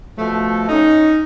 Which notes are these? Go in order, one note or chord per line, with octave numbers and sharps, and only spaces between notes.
B2 F3 A3
C#4 D#4